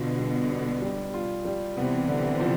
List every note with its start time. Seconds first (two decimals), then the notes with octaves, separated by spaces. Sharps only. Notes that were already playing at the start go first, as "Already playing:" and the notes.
Already playing: B2 D3 F4
0.19 G3
0.51 D4
0.82 G3
1.14 F4
1.45 G3
1.77 C3 E3 B3
2.08 D3
2.40 F3